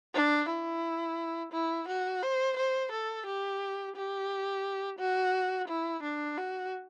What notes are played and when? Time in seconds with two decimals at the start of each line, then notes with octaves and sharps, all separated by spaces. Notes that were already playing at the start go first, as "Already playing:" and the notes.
0.14 D4
0.49 E4
1.52 E4
1.88 F#4
2.22 C5
2.57 C5
2.91 A4
3.26 G4
3.96 G4
4.99 F#4
5.68 E4
6.03 D4
6.37 F#4